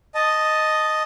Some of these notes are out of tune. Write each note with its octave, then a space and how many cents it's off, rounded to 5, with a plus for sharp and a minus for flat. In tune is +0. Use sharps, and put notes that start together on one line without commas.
D#5 +0 A5 +0